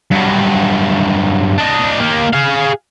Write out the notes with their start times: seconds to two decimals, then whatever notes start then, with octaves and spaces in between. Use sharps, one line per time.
0.11 G2 F#3
1.58 D4 D#5
2.00 A#3 G4
2.33 G#4 F5